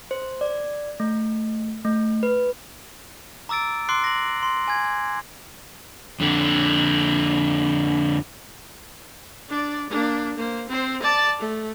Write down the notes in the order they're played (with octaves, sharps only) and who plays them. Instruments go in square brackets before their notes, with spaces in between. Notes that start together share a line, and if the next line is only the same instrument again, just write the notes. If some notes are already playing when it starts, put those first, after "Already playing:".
[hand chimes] C5
D5
A3
A3
B4
[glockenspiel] A#5 D6 E6 A6 D7
C6 D6 F#6 C7 D7
A#6 F#7
C6
G#5 G#6
[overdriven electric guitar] F2 D3
[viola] D4 D5
A#3 D4
A#3 C5
C4 C5
D5 A5
A3